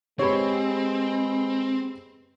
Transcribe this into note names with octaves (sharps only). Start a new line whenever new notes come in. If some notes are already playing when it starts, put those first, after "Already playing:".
G#3 C4 G4 B4 C#5 B5